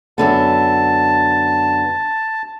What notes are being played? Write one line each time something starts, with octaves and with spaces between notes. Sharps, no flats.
F#2 D3 B3 A5